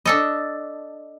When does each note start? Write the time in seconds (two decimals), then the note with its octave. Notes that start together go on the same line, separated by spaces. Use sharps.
0.06 D4 A4 D#5